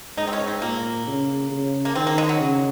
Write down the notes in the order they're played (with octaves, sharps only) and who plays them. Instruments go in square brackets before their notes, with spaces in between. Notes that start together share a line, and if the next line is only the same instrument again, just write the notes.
[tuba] G#2 [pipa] D#4
[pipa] C4
C#4
C4
[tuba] A#2 [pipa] A#3
[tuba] C#3
C#3
[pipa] A#3
[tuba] D#3 [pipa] C4
[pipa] A#3
G#3
F#3
[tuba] C#3